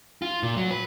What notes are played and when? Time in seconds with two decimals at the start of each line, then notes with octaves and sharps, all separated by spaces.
0.22 F4
0.43 A#2
0.57 F#3
0.71 B4